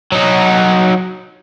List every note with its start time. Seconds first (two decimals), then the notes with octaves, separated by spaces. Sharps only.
0.12 F#3 D#4